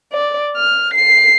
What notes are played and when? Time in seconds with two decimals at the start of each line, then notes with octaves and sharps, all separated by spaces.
0.12 D5
0.56 F6
0.93 C7